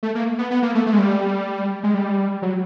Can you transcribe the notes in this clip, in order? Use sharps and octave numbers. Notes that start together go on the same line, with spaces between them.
A3
A#3
B3
B3
A#3
A3
A3
G#3
G3
G#3
G3
F#3